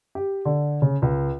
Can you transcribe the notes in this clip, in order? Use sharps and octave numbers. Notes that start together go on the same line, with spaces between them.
G4
D3
C#3
C#2